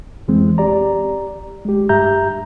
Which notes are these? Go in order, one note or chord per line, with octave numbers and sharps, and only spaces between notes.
F2 E3 G#3 C4
G4 D5 A#5
G#3 G4
G2 G4 E5 A#5 G6